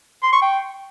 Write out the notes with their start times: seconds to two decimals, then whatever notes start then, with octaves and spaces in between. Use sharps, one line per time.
0.23 C6
0.32 C#6
0.42 G5